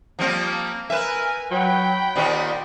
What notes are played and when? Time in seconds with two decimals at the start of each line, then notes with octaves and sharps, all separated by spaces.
0.19 F3 G3 A#3 C4
0.90 A#4 B4 E5 G#5
1.52 F#3 C#5 F#5 G5 B5
2.16 A#2 D#3 G4 C5 D5